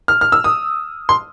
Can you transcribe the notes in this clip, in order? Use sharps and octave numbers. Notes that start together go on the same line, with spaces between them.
F6
F6
E6
D#6
C6